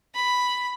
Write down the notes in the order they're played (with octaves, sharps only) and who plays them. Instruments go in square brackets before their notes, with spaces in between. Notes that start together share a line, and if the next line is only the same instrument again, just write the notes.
[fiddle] B5